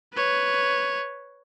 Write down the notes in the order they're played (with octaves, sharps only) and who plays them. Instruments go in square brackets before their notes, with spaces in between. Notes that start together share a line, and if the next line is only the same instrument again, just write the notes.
[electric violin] B4 C#5